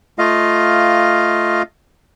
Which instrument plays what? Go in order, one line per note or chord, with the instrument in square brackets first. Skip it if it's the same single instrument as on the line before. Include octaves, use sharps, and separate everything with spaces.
[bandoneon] A3 F4 D#5 F5